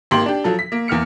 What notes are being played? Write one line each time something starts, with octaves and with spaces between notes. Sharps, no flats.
G#1 A#3 G4 C6 F#7
D4 G4
F3 F#3 A4
B6
A#3
E2 A#3 F6 C#7